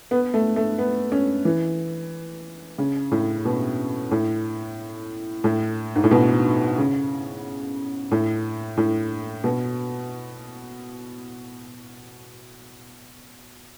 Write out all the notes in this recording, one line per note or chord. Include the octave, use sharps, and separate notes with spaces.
B3
A3
A3
B3
C#4
E3
C#3
A2
B2
A2
A2
G#2
A2
B2
C#3
A2
A2
B2